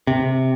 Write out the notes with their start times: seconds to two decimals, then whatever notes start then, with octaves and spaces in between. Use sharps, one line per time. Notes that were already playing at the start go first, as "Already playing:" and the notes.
0.07 C3